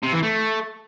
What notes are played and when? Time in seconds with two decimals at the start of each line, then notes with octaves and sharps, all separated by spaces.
0.03 C3
0.13 E3
0.23 A3